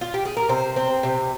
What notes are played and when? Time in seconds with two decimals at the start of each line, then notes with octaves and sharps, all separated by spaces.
0.01 F4
0.14 G4
0.25 G#4
0.37 A#4
0.49 C3 C5
0.76 C4
1.03 C3